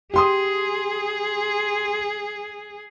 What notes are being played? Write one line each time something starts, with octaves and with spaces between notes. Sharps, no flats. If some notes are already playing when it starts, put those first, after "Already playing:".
G4 G#4 C6 D#6